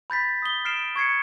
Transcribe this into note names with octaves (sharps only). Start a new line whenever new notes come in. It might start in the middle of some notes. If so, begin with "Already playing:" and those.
B5 G6 A6 B6
D#6 G7
F6 C7 D7 E7
C#6 G#6 C7 C#7